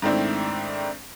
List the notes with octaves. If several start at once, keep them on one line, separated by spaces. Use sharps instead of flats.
G#2 D#3 A3 C4 D4 E4